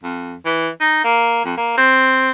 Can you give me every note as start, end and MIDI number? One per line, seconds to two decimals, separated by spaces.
0.03 0.35 41
0.45 0.68 52
0.80 0.99 63
1.04 1.44 58
1.45 1.54 41
1.57 1.77 58
1.77 2.31 60